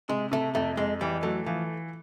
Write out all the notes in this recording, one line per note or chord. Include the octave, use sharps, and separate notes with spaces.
C3 G#3
C3 A3
F2 A3
F2 G#3
E3 G3
F#3 A3
E3 F3